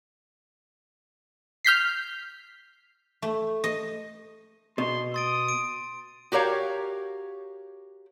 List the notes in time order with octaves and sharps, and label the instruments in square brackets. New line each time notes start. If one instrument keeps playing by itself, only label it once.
[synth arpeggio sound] F6 G6 B6 C7
[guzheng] A3
D#5
[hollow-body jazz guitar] B2 [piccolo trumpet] C6
[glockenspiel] C6 A6 D7 [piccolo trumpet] D#6
[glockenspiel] D7
[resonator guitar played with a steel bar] F#4 G4 A#4 C#5 F5